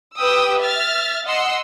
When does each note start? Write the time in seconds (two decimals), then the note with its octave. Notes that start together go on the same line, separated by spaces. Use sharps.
0.17 G4 B4 G5 D#6 E6
0.59 E5 F6 A6
1.26 D#5 F#5 C6 E6